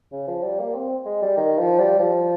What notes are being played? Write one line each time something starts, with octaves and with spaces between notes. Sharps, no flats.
C#3
F3
G3
A#3
C4
G#3
G3
D#3
F3
G3
F3